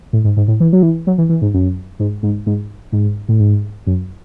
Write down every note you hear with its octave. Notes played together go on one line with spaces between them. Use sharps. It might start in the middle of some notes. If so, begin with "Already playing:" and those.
A2
G#2
G#2
A2
E3
F#3
E3
F#3
E3
E3
G#2
F#2
G#2
G#2
G#2
G#2
A2
G#2
F#2